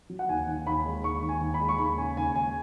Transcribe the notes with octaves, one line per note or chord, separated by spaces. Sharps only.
F#3
F#5
D#2 G#5
D#3
D#2 B5
G#3
D#2 C#6
D#3
G#5
D#2
B5
G#3
C#6
D#2 B5
C#3 G#5
D#2 G#5
G#3 G#5